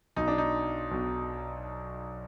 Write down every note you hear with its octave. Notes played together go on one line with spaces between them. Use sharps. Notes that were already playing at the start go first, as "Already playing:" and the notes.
B1 B2 D#4
D4
D#4
B1 B2